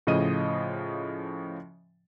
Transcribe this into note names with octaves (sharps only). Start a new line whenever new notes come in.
A2 C#3 F3 D#5 D#7